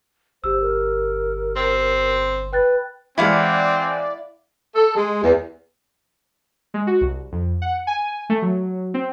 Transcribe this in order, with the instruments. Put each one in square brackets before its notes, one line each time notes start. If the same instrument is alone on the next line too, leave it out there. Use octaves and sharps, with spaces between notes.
[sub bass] G1 [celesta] G4 E6 [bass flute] C5
[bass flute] A#4
[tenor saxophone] C4
[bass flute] B4 [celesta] G5 F#6 A6
[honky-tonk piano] E3 G#3 [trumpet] C4 [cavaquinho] E4 F5 F#5 [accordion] D5
[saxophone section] A4
G#3
E2
[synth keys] G#3
F#4
C2
F2
F#5
G#5
A3
F#3
C4